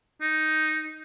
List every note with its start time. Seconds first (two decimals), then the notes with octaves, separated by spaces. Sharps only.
0.21 D#4